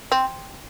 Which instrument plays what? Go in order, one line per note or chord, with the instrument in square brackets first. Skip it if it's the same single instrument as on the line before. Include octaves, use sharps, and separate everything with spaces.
[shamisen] C4